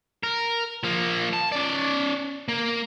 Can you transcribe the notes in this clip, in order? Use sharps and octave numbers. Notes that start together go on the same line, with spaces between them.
A#4
F3 A#3
A5
C#4 D5
A#3